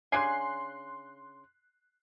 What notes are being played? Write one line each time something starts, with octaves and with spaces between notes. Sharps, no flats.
C#3 D4 G#5 C6 F#6 C7